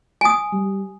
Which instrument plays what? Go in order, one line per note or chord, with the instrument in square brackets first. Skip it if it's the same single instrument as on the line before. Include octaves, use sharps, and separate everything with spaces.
[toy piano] G#5 D#6
[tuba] G3